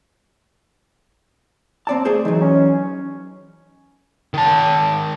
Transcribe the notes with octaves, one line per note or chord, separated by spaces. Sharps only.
C4 D5 A5
A3 G#4 C5
E3 F#3 D#4
C#4
D#3 A5